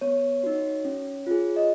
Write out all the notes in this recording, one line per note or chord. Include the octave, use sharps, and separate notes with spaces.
B3 C#5
D#4 F#4
C#4
F4 G#4
D#5